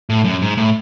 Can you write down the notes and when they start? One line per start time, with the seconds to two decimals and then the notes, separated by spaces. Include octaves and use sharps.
0.10 A2
0.25 F#2
0.42 G#2
0.57 A2